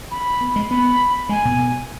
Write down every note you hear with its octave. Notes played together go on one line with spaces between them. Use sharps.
B5
B3
G#3
B3 B5
G#3 G#5
B2